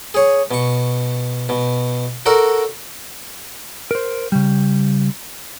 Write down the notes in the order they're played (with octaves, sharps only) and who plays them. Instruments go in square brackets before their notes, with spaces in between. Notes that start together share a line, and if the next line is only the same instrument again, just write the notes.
[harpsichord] G#4 C#5
B2 C#6
B2
F#4 A4 A#4 D5
[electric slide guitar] A#4 C5
C#3 G3